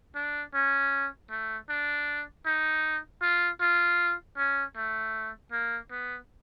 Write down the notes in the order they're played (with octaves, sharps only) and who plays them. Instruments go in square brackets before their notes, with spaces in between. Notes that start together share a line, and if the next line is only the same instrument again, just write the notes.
[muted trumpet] D4
C#4
A3
D4
D#4
F4
F4
C#4
A3
A#3
B3